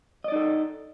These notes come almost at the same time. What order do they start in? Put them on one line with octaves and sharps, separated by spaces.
D#5 D5 D#4 A4